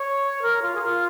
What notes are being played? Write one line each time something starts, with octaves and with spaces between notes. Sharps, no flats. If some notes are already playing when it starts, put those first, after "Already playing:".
Already playing: C#5
A#4
F4
G#4
F4